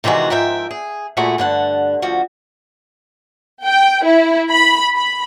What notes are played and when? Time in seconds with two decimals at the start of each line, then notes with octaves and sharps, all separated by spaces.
0.04 C3 D#3 E3 G#3 F#4
0.30 G#2 F3 A#4 E5 G5
0.71 G#4
1.17 A#2 A3 E4 F#4 G#4
1.38 G2 D3 F#5 A5
2.02 D2 F3 F#4
3.64 G5
4.04 E4
4.51 B5
4.94 B5